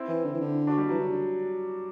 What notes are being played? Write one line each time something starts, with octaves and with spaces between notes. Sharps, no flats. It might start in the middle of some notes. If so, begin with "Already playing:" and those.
Already playing: C4 E4
E3
D3
E3
D3
D4 F#4
G3
E3 F#3
D3
D3